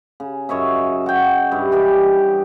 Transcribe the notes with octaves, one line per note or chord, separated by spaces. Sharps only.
C#3
F#2 C#5 D#5 E5
F#4 G5
G2 E4
E3 G4 B4 D#5